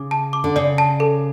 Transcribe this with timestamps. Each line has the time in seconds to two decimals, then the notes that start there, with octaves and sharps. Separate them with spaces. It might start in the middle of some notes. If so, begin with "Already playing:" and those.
Already playing: C#3 D6
0.11 A5
0.33 D6
0.44 D3
0.56 C#3 D5
0.78 A5
1.00 A4